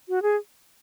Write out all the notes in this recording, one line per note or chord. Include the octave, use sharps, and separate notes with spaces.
F#4
G#4